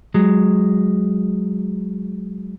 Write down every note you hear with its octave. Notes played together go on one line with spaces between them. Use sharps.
F#3 G#3